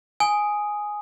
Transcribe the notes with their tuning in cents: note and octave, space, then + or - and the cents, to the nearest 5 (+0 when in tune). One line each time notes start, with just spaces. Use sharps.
G#5 +0 D#6 +0